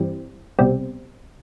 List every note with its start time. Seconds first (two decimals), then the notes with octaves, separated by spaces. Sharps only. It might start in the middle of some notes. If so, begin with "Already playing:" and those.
Already playing: G2 E3 G3 C4
0.59 C2 B2 G3 C4